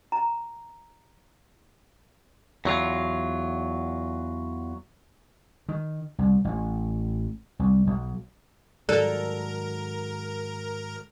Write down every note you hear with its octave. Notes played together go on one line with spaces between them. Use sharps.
A#5
E2 F#3 F4
D#3
C2
A1
C2
B1
G#2 D#3 F#3 A4 A#4 D5 F#6